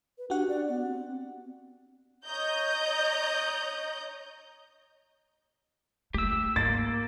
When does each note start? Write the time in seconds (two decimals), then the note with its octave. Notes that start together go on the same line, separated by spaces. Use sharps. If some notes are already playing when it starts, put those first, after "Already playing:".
0.18 B4
0.30 D4 F#4 G4 F#5
0.49 D5
0.69 B3
0.85 C4
2.25 C#5 D#5 A#5 G6
6.14 A3 G4 E6
6.56 G#2 A#3 A6